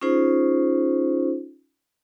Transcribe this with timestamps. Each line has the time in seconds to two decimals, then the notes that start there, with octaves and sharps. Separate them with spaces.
0.01 C#4 D#4 F4 G#4 C5